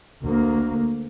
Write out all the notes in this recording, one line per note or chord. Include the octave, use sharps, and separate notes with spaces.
D2 A#3